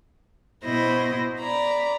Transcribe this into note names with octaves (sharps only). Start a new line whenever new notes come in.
B2 E4 C5 D#5 A#6
D5 A#5 B5